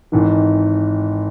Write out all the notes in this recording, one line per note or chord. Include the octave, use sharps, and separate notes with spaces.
G#1 G#2 E3